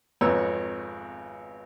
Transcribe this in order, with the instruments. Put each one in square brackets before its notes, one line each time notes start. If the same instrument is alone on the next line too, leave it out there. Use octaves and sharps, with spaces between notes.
[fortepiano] G#1 F2 B3 C#5 A#5 E6